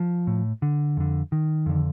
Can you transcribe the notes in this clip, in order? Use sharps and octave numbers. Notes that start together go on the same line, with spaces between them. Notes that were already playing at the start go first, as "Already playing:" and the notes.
Already playing: F3
A2
D3
F2 D3
D#3
F2 D3